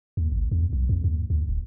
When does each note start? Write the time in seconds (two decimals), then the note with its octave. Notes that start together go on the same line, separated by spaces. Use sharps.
0.17 D#2
0.32 G#1
0.52 E2
0.73 B1
0.89 F2
1.04 D#2
1.30 D2
1.49 D1